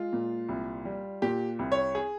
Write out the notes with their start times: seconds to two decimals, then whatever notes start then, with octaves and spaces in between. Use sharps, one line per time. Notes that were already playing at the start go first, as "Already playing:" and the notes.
Already playing: G#3 F4
0.13 A#2
0.49 C2
0.85 G3
1.22 A#2 G4
1.59 C2
1.72 C#5
1.95 G#4